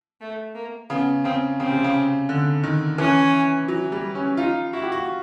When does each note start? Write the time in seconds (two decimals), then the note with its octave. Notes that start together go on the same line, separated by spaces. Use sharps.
0.21 A3
0.55 A#3
0.90 C#3 B3
1.24 C#3 C4
1.60 C#3 C4
1.72 C3
1.84 C#3
2.29 D3
2.63 D#3
2.98 E3 C#4
3.68 F#3
3.92 G3
4.15 C#4
4.37 D#4 F4
4.73 E4 F#4
4.82 G4
4.92 F#4